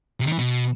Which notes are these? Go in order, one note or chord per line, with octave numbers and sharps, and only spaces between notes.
C3
D#3
E3
B2